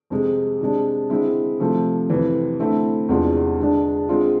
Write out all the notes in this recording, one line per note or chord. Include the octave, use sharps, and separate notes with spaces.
F2 C3 G#3
C3 G#3 D4
D3 G#3 C4 E4
C3 F3 A3
F2 C3 E3
D3 A3 C4 E4
E2 C3 G#3 D4 F4
D3 G#3 D4
D3 G#3 C4 F4